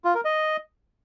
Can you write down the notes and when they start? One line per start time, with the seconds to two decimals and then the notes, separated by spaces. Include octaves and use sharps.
0.05 F4
0.15 A#4
0.25 D#5